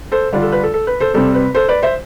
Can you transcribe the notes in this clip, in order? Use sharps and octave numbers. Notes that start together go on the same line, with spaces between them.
A4 C5
D3 G3 D4 F4
A4
B4
A4
A4
B4
A4 C5
C3 G3 C4 A4
B4
A4 C5
B4 D5
C5 E5